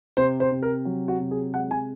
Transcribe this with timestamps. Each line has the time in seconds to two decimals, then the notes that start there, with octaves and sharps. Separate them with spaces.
0.17 C3 C5
0.40 C5
0.52 C3
0.63 A#4
0.85 F#3
1.08 F#4
1.19 C3
1.31 G#4
1.54 G#3 F#5
1.71 G#5